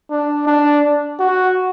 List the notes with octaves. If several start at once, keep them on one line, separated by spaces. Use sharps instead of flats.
D4
D4
F#4